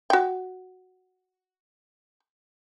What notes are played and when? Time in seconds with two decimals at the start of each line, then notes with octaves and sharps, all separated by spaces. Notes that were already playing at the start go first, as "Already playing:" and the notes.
0.10 F#4 G5